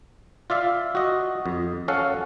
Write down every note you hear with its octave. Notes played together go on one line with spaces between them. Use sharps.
F4 D5 E5 F5
F#4 D#5
F2
C#4 A4 F5 F#5